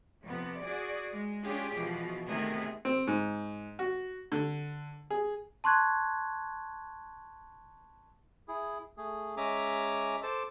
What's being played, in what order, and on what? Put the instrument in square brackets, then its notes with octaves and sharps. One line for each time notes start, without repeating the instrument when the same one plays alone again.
[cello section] F2 C3 B3
F#4 G#4 D5
G#3
C#4 D4 F4 G4 G#4
B2 E3 F3
C3 D#3 A3 B3 G#4
[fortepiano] C4
G#2
F#4
D3
G#4
[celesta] A5 C6 C#6 F#6 G#6
[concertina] E4 G#4
A3 G#4
G#3 C#4 E5 G#5 A#5 D6
A4 C5 A5 D6